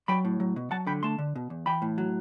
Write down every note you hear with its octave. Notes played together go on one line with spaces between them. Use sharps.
F#3 G5 B5
A2
F#3
B2
F#3 F#5 A5
D3 G5 B5
A3 A5 C6
D3
B2
E2
E3 G5 B5
A2
F#3